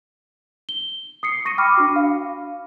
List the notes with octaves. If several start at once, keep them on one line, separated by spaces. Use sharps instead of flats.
G7
D#6 C7 C#7
C#6 A#6 C#7 D#7
G5 B5 D6 F6
D4 F#4
F5